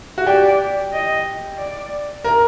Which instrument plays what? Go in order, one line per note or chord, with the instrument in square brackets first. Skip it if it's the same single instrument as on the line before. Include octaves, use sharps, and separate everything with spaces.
[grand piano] F#4
[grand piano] G4 [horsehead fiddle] D5
[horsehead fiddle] D#5
D5
[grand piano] A#4